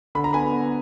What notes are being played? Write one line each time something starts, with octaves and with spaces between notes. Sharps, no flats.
D3 B5
A#5
B3 G#5 B5
B3